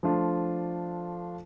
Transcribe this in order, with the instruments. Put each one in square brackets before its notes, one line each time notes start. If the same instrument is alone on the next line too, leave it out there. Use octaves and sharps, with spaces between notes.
[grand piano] F3 A3 D4 F4